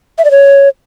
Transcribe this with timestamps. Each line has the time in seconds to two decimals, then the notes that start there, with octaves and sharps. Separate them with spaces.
0.18 E5
0.25 D5
0.31 C#5